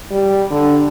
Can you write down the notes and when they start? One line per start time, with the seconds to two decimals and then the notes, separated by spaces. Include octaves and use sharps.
0.11 G3
0.51 D3